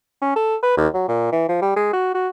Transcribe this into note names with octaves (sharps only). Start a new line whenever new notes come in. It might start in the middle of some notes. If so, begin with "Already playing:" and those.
C#4
A4
B4
D#2
F#3
A#2
E3
F3
G3
G#3
F#4
F#4